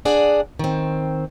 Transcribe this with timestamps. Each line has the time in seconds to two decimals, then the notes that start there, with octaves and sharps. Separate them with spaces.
0.05 D4 G#4 D5 F#5
0.59 D#3 C4